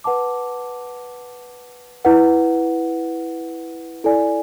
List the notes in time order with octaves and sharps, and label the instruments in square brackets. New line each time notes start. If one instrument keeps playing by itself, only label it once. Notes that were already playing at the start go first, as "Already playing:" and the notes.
[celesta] B4 F#5 A5 D6
E4 B4 F#5
E4 A4 D5 G#5